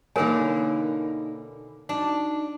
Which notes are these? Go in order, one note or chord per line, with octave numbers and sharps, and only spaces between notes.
B2 D3 E3 A#3 D#4 A#4 C#5 G#5
D4 D#4 F#4